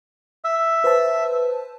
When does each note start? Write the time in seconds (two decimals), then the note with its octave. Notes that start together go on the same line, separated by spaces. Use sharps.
0.45 E5
0.84 B4 C5 A5